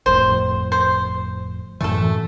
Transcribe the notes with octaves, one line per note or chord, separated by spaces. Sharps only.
G1 F2 A2 C5
C5
F#2 A2 E3 A3 A4